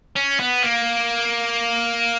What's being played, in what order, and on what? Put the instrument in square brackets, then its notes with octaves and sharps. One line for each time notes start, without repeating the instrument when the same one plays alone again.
[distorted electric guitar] C#4
B3
A#3